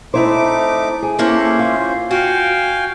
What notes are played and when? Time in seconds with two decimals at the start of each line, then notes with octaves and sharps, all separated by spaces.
0.14 A3 C4 D#4 E4 C5 D6
1.02 G#4
1.19 A#3 C#4 E4 A4 C5
1.59 F4
2.11 F#4 F5 G5 G#5